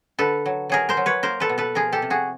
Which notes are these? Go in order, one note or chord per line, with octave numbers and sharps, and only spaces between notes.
D3 A4 B4
F#3
F#3 G#4 A#4
A#4 C5
F#3
B4 C#5
A#3 A#4 C5
A4 B4
B2
A4 B4
F3 G#4 A#4
G4 A4
C3
F#4 G#4